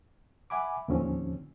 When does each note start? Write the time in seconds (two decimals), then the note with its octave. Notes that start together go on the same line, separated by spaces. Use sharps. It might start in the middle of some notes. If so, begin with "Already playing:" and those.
0.50 E5 F#5 G#5 B5 D6
0.88 D#2 A2 D3 F3 C4 C#4